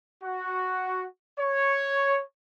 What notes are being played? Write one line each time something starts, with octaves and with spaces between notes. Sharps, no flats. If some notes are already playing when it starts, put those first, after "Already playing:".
F#4
C#5